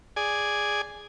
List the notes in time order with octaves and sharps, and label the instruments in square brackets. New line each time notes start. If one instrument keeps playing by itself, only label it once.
[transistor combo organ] G#4 D5 G#5